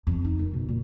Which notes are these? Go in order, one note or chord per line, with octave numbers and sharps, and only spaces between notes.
F2
D#4
D#3
B2
A#2